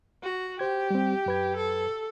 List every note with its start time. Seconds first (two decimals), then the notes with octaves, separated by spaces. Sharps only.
0.23 F#4
0.59 G4 C5 G#6
0.90 G3 C4
1.26 F#2 B4 G#6
1.56 A4